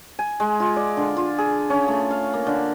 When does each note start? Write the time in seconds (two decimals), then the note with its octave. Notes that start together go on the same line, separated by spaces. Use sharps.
0.19 G#5
0.40 G#3
0.60 F4
0.76 D5
0.97 D3
1.17 F4
1.38 G#4
1.70 C#4
1.88 A3
2.11 F5
2.33 A#3
2.47 D3